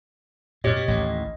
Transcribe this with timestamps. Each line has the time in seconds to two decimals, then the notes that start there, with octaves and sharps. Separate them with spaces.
0.64 F#2 A#2 G4 C#5 D#5
0.76 B2
0.88 A1 D#2 A2 D#5